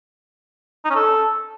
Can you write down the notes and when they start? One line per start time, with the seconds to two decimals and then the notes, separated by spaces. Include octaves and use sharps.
0.85 D#4
0.90 C#4
0.95 A4